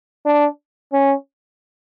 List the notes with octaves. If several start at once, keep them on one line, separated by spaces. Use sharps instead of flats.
D4
C#4